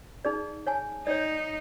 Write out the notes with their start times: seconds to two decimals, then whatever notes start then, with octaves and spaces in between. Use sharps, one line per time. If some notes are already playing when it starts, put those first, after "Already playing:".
0.25 D#4 G#4 D5
0.67 C#5 G#5 A5
1.07 D#4 C#5 D5